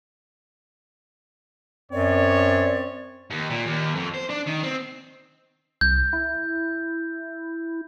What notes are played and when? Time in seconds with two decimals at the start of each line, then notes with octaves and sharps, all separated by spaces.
1.92 F#2 C4 C#5 D5
3.31 D#2
3.50 A#2
3.66 D#2
3.95 F2
4.14 C5
4.30 D4
4.47 D#3
4.63 C4
5.81 C2 G6
6.13 E4